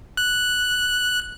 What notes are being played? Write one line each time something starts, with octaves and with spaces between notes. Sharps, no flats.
F#6